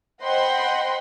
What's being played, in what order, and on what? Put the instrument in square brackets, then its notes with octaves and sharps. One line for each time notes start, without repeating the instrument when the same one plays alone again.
[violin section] C5 D#5 F#5 G5 B5 C6